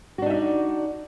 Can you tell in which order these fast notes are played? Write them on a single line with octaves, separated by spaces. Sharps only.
F#4 D4 D#4 E5 D5